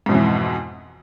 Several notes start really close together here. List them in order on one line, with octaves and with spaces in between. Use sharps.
G#2 B2 F2 E3